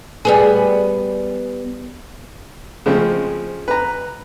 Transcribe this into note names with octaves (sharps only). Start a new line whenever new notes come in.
G3 B3 G#4
C#3 F3 G#3 C4 C#4
B4 A#5